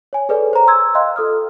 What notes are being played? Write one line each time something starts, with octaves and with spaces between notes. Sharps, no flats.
C#5 G#5
G#4 A4 B4 C#5 D5 G#5
C5 A#5
C6 E6 G#6
D#5 F5 G5 C6 F#6
F4 A4 D#6 F6